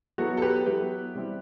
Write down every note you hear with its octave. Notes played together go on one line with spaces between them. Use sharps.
F#3 B3 E4 F#4 A4
A4
G4 B4
F#3 B3 E4 G4 B4
C3 G3 C4 E4